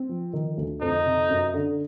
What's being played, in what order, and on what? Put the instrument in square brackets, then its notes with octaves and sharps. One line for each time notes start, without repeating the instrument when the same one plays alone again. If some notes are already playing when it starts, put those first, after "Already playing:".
Already playing: [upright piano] C4
F3
D#3
D2
[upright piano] F2 [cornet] D#4
[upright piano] C3
F#2
D3